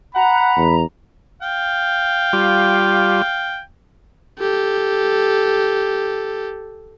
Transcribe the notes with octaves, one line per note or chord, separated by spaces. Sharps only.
F#5 A#5 B5
E2
F5 G5
G3 F4
G4 A4